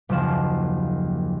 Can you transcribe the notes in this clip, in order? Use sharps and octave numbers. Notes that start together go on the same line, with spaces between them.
F#1 D#2 F3 E7